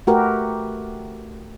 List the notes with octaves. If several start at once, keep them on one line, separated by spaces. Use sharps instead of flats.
A3 F#4 G4 A#4 B4